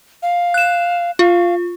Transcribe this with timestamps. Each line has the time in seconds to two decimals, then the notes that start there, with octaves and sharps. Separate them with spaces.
0.23 F5
0.54 F#6 E7
1.19 F4 F5